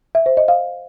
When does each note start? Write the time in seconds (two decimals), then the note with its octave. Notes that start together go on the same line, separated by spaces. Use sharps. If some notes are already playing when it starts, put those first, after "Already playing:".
0.15 E5
0.26 C5
0.37 D#5
0.48 F5